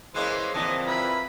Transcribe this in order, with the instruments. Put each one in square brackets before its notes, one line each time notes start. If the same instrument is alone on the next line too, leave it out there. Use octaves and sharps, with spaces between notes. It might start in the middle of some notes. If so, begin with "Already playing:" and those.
[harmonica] E3 C5 [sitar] G#3 A#3 C#4
[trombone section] A#2 F3 C4 [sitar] D3 E3 [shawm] D#5 [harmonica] A5
[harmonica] E4 A#4 B4 [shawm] B5